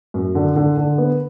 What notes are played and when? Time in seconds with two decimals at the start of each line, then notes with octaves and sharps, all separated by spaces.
0.14 F#2
0.35 D3
0.56 D3
0.77 D3
0.98 B3